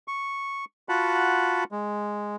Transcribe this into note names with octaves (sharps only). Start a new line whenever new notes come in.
C#6
F4 F#4 F#5 A5 B5
G#3